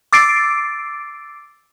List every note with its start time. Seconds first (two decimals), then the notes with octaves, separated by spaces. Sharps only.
0.13 D6 E6 A6 C7 D7